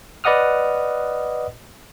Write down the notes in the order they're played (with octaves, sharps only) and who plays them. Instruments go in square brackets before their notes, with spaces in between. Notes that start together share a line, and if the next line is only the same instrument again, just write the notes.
[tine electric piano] B4 D5 D#5 F#5 D#6 F6